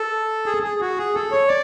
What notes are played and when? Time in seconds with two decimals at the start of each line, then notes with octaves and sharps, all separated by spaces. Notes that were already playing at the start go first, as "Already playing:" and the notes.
Already playing: A4
0.46 G#4
0.63 G#4
0.81 F#4
0.98 G#4
1.15 A4
1.32 C#5
1.48 D5